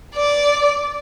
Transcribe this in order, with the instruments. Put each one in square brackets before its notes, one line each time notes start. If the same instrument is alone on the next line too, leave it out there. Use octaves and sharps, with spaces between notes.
[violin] D5